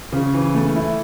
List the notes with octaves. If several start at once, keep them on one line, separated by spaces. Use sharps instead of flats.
C#3
E3
A3
E4